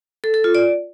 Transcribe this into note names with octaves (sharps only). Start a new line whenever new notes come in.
A4
A4
F4
D5